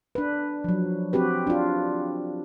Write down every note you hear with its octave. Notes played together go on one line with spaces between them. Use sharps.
D4 B4
F3 F#3
C4 F#4 G4 B4
D4 F4